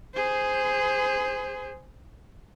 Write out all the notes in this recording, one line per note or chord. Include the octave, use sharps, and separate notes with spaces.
G#4 C5